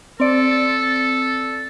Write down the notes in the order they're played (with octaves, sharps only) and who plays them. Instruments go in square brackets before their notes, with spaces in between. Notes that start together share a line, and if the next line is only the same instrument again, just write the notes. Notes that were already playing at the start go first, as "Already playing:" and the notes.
[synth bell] C4 D5 [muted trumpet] A4